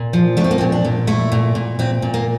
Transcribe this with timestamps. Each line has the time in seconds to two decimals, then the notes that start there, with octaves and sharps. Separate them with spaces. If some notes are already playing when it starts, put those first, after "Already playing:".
Already playing: A#2
0.13 F3
0.37 A3 D4
0.44 C4
0.51 A#3
0.58 C4
0.61 A#2
0.72 D4
0.85 A#2
1.07 A3 E4
1.32 A#2
1.55 A#2
1.79 A#2 C4
2.02 A#2
2.14 A#3